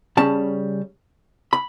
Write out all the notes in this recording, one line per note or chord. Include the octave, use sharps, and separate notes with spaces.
C#3 G3 C#4 A5
B5